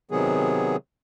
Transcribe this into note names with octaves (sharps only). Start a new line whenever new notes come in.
C3 D#3 F#3 B3 G#4